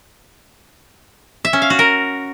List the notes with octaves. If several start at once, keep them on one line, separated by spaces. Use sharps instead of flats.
E5
C#4
F5
F#4
A#4